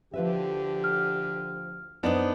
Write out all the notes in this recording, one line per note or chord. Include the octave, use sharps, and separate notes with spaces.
D2 D3 F3 G4 B4 E5
F6
F#2 B3 D4 D#4 A#4 C5